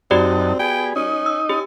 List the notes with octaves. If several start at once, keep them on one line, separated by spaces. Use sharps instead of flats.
F#2 C4 D#4 F#4 G4 D5 A5
B3 G#4 G5
C#4 D#4 D#5
E6
C#4 G4